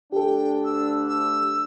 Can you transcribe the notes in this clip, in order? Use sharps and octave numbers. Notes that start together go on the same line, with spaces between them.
D2 D4 G4 A4 G5
E6
E6